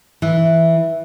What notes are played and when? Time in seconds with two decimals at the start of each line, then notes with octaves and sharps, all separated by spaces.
0.22 E3